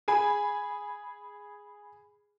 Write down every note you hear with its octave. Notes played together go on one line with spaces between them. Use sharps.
G#4 G#5 B5